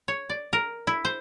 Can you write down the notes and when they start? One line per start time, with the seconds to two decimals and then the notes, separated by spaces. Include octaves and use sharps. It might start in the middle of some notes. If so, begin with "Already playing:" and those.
0.08 C#5
0.30 D5
0.53 A#4
0.87 E4
1.05 C5